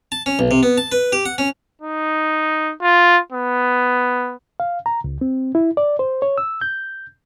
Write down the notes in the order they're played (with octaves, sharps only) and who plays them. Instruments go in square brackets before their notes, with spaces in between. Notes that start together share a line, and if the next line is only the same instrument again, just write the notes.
[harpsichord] A5
C#4
B1
C3
B3
A5
B4
G4
F#5
C#4
[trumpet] D#4
F4
B3
[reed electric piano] F5
A#5
C#2
C4
E4
D5
C5
C#5
E6
G6